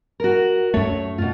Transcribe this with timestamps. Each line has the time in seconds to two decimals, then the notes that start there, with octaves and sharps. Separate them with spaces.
0.20 F#4 A#4
0.74 F#2 A3 C#5
1.18 B2 F4